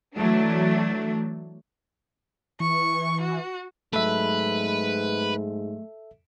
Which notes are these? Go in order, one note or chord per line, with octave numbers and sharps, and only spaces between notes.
E3 F#3 A3 D4
E3 C#6
F#4
G#2 F#3 A3 A4 B4 E5